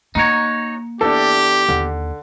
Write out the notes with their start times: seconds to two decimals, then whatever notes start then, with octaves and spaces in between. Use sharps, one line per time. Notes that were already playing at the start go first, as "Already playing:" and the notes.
0.15 A#3 D#4 F#4 C#5 A#5 C#7
1.01 E2 D4 G4 A4
1.69 D#2 D3